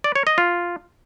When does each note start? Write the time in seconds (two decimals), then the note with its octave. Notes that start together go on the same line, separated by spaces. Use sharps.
0.04 D5
0.16 C#5
0.27 D#5
0.38 F4